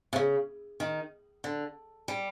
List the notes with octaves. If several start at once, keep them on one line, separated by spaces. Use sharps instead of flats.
C3
C#3
D#3
D3
G3